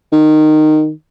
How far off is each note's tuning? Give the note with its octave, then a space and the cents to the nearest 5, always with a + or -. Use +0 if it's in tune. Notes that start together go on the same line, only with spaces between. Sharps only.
D#3 -15